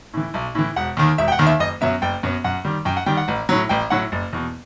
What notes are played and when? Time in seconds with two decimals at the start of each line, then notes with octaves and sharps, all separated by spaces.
0.14 A2 E3
0.34 B1
0.55 A2 E3
0.76 E1 F#5
0.97 D#2 D#3
1.18 E1 E5
1.28 G5
1.32 F#5
1.39 D#2 D#3
1.46 E5
1.59 F#1 D#5
1.81 F#2 F#3 B3 E5
2.02 F#1 G5
2.23 F#2 F#3 B3
2.44 F#2 F#5
2.64 D#3 G3
2.85 F#2 G5
2.97 F#5
3.06 D#3 G3 G5
3.17 F#5
3.28 A1
3.49 A2 F#3
3.69 A1 G5
3.90 A2 F#3 F#5
4.12 F#1
4.33 E2 B2